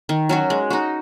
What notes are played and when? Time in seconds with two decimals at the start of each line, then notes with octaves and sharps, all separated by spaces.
0.09 D#3
0.29 F#3 C#4 F#4
0.50 G#3
0.70 D#4 F#4